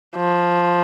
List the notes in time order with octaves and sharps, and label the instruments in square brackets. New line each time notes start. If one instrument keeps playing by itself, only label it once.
[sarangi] F3